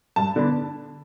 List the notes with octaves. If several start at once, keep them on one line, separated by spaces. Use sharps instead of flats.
G2 A5
D3 B3 D4